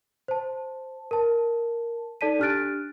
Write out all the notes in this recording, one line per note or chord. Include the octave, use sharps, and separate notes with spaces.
C5 A5
A#4 A5
D#4 A4 D5 A5 B6 D#7
D4 G4 F6 F#6 A6 D7